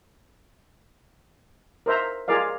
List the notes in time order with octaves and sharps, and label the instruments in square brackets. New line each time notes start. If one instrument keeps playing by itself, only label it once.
[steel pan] A#4 C5 E5 A#5
F4 G#4 A#4 D5 F5